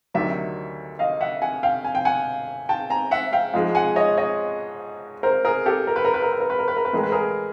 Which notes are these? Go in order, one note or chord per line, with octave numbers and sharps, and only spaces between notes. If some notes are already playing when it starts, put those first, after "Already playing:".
D2 C3 D#3 F#3 D5 E5
D#5 F5
E5 F#5
F#5 G#5
F5 G5
G#5
G5
F#5 G#5
G5 A5
G#5 A#5
E5 F#5
F5 G5
G#2 F3 G#3
F#5 G#5
C#5 D#5
C#5 D#5
A#4 C5
G#4 A#4
G4 A4
A#4
B4
A#4
B4
A#4
B4
A#4
B4
A#4
B4
A#4
B4
A2 E3 G#3 A#4
B4
G#4 A#4